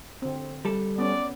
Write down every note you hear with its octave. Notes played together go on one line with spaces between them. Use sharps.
D3 C4
G3 A4
B3 C#4 D5